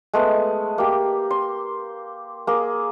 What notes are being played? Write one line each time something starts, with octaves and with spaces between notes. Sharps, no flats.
G#3 A3 B3
A#3 G4
C6
A#3 G#4